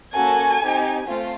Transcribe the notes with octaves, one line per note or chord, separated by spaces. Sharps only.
A#3 C#4 F#4 A4 G#5
C4 D#4 G4
A3 C4 F4